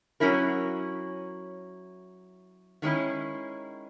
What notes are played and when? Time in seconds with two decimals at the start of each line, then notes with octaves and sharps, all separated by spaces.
0.20 F#3 C#4 E4 A#4
2.82 D#3 G#3 C#4 E4